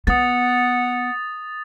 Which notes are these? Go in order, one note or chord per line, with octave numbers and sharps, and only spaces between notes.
B3 F#5 D#6 A6